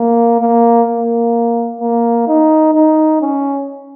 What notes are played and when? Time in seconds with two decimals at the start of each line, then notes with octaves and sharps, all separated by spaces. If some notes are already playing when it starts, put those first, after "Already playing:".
Already playing: A#3
0.39 A#3
0.87 A#3
1.81 A#3
2.27 D#4
2.74 D#4
3.21 C#4